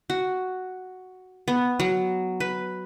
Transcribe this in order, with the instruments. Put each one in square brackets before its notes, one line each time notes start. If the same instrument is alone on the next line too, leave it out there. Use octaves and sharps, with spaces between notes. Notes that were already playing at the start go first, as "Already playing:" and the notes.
[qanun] F#4
B3
F#3
B4